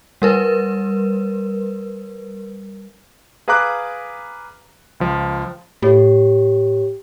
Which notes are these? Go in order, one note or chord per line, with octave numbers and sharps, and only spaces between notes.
G3 A#4 B4
G#4 B4 F5 A#5 D6 F#6
C#2 F3
A2 G4 C#5